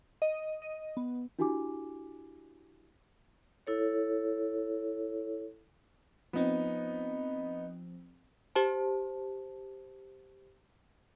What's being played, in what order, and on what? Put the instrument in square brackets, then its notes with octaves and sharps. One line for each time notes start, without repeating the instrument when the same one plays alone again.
[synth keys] D#5
D#5
B3
[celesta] D4 E4 F#4 G4 G#5 D6
[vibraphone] E4 A4 C#5
[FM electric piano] F3 C4 [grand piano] B3 D#4
[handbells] G4 C5 A5